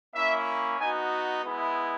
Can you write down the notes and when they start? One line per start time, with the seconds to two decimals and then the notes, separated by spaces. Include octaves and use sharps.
0.13 A#3 C#4 E4 E5
0.78 B3 D#4 F#4 G#5
1.44 G#3 B3 E4